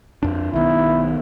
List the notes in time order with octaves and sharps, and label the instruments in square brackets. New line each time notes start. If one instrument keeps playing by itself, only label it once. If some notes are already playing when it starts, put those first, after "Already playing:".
[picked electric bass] F2 D4
[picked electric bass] B1 D#3 B3 [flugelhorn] E4